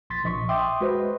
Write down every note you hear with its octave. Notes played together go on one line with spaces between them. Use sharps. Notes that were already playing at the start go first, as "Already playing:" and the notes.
A#1 C6 A6 B6
A#1 D#5 C#6
E5 G5 C6 D6 D#6
G#3 F#4 B4 C5 D#5